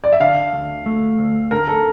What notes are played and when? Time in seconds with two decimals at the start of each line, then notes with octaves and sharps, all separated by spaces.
0.04 D5
0.12 E5
0.20 D3 F5
0.53 D2
0.86 A3
1.19 D2
1.51 D3 A#4
1.67 A4